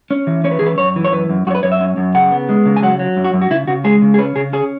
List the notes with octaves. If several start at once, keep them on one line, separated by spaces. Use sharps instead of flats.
C#4
E3
C#4 C#5
B4
E3 G#4
B4
F#2 C#5
E3
C#5
F#2 B4
F#2
F#2 F#4 C#5
B4
F#2 C#5
E5
C#4
F#2
C#3 F#5
B3
G#3
C#3
G#5
F#3 F#5
F#3
F#2
F#4
F#2
F#4
C#3 E4
C#3 F#4
G#3 G#4
C#3
G#4
C#4 B4
C#3 G#4
C#4 G#4